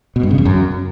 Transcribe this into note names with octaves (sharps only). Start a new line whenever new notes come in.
B2
G2
C#3
E2
F#2